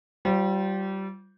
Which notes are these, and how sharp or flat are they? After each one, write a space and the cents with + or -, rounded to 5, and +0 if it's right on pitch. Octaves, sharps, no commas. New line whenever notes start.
G3 -25 F4 +0 C5 +0